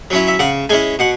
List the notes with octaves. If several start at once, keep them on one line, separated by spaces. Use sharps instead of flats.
F#3 C#4 E4
E5
C#3 F#5
G#3 C#4 E4 G#5
B2 F#5